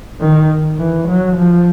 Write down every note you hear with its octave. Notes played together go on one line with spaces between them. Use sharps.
D#3
E3
F#3
F3